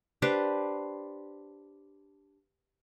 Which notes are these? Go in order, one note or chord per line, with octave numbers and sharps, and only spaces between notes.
D4 G4 B4 C5